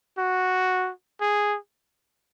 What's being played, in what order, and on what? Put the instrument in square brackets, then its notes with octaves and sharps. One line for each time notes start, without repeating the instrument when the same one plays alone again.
[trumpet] F#4
G#4